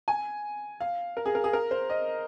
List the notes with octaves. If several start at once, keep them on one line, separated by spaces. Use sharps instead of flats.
G#5
F5
A#4
G#4
A#4
G#4
A#4
C5
D#5